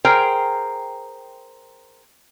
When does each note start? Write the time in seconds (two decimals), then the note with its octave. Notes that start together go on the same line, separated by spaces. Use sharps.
0.05 G#4 A#4 C5 G5 A#5